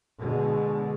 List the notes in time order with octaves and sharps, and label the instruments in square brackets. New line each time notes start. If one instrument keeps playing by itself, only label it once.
[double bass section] B2 D3 G#3